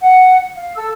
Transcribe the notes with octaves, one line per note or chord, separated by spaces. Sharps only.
F#5
F5
A4 E6